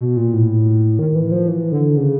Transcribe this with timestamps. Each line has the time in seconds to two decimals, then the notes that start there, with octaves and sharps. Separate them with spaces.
0.01 B2
0.17 A#2
0.34 A2
0.99 D#3
1.15 E3
1.32 F3
1.48 E3
1.72 D3
1.97 C#3